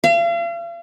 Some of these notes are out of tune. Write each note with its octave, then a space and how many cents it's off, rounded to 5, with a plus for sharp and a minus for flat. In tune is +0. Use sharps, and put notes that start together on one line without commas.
F5 -40